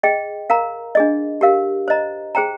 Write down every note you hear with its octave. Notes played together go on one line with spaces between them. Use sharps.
G#4 D#5 G5
A#4 F5 A#5
D4 G#4 D#5
G4 A#4 F5
C5 D#5 A#5
G#4 C5 G5 A#5